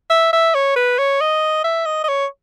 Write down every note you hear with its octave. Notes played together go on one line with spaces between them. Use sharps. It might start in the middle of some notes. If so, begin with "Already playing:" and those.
E5
E5
C#5
B4
C#5
D#5
E5
D#5
D#5
C#5